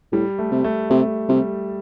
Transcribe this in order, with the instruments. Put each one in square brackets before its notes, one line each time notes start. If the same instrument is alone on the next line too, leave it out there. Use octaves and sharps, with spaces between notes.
[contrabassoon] A2 [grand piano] G3
[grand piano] A3
[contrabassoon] C3
[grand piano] A3
[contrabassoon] C3 [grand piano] A3
[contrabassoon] C3 [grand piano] G3